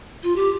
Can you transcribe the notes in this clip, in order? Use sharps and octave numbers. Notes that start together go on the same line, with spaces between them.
F4
G4